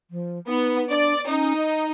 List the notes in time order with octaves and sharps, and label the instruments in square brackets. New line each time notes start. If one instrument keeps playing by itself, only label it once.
[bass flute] F3
[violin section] B3 [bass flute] D#4
[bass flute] D4 [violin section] D5
[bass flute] C#4 [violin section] D#4
[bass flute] D#5